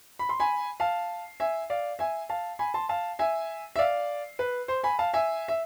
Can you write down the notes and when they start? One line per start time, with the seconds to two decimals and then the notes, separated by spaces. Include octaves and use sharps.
0.19 B5
0.29 C6
0.40 G#5 B5
0.80 F5 A5
1.40 E5 G#5
1.70 D5 F5
1.99 E5 G#5
2.30 F5 A5
2.59 G#5 B5
2.74 A5 C6
2.89 F5 A5
3.19 E5 G#5
3.76 E5
3.79 D5 F5
4.39 B4
4.68 C5
4.84 G#5 B5
4.99 F5 A5
5.14 E5 G#5
5.48 E5